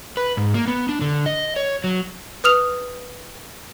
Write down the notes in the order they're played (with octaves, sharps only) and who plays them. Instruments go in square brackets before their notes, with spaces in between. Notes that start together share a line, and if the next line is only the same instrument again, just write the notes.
[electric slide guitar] B4
G#2
A#3
B3
D4
D3
D#5
C#5
F#3
[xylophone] B4 D#6 F6 F7